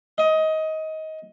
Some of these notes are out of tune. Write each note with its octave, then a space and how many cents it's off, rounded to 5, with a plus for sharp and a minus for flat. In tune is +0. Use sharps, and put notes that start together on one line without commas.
D#5 +20